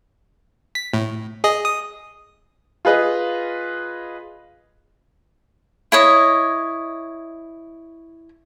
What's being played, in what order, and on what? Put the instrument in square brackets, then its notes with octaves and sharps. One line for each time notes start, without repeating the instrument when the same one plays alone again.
[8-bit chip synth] B6
A2
G#4 D#5
D#6
[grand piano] F4 G#4 B4 D#5
[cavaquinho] E4 C#5 D#5